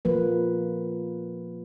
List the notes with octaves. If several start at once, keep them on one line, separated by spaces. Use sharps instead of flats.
F3 A#3 B4